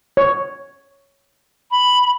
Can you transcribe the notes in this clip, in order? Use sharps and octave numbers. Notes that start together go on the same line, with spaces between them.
C#5
B5